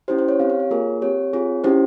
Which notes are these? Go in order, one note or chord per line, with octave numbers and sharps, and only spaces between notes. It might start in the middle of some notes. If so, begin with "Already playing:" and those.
C#4 E4 G4 C5
C5
C#5
C4 G4 F5
F5
C#5
A#3 F4 G#4 A#4
C4 G4 C#5
C4 F4 G#4
C#4 E4 G4 C5